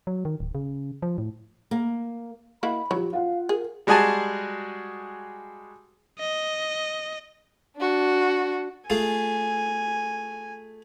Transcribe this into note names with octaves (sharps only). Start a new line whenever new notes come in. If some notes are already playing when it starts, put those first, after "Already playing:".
F#3
D#3
D1
C#3
F3
A2
A#3
A#3 E4 F#4 D#5 B5
F3 F#3 G4 C#5
F4 F5 F#5
G#4 A#4
G3 G#3 F#4 G#4 G#5 A5
D#5
D4 F#4
A3 F4 G#4 G#5